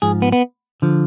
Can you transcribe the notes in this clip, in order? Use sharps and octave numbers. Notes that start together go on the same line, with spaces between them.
G#2 F3 G#4
B3
B3
D3 F3